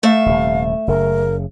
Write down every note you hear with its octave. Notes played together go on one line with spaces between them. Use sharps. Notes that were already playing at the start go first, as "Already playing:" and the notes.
A3 E5 F5
D#1 C3
F#1 C#3 A#4